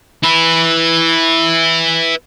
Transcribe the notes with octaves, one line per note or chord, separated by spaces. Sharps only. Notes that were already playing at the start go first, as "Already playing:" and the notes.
E4 B4